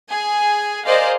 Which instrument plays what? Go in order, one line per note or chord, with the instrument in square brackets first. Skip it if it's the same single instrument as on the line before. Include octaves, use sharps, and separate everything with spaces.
[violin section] G#4 G#5
G#4 A#4 C5 D5 D#5 F5